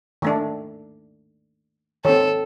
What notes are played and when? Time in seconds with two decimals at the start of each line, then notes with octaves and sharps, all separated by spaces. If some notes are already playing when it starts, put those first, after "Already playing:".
0.22 D#3 A3 D4
2.05 D#3 C4 A4 C#5